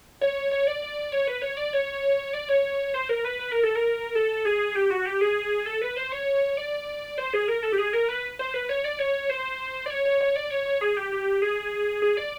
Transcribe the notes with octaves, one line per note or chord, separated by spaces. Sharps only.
C#5
C#5
D5
D5
C#5
B4
C#5
D5
C#5
D5
C#5
C5
A#4
B4
B4
A#4
A4
A#4
A4
G#4
G4
F#4
G4
G#4
A4
B4
C5
C#5
D5
C5
G#4
A#4
A4
G4
G#4
A#4
B4
C5
B4
C#5
D5
C#5
C5
D5
C#5
C#5
C#5
D5
C#5
C#5
G#4
G4
G4
G#4
G#4
D5